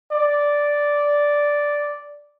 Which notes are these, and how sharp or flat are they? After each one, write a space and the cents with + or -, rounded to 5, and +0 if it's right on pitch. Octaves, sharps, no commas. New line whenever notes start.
D5 -5